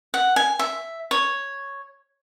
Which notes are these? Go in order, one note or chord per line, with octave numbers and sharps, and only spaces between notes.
F#5
G#5
E5
C#5